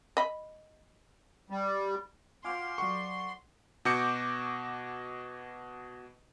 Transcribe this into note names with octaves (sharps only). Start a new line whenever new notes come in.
D#5 B5
G3
F4 F#4 C5 G#5 C6 D6 F6
F#3 A4 D5 F#5 C#6
B2 F#4 D6 G6 C#7